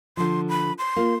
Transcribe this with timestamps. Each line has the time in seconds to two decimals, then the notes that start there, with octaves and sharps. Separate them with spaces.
0.17 D3 F3 C6
0.49 B5
0.78 C6
0.96 A#3 F4